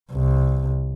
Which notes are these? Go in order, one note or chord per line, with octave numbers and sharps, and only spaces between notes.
C2